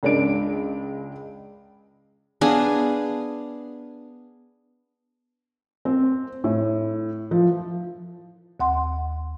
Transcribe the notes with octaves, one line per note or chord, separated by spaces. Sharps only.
C#2 G#3 D4 D7
B3 D4 G#4 F5
C4
A2
F3
D#2 F#5 C6